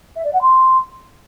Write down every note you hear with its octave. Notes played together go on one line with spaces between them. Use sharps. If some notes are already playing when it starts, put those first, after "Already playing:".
E5
D5
F#5
C6